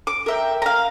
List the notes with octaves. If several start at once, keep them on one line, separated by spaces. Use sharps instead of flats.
D6
A#4 E5 G5
F5 A#5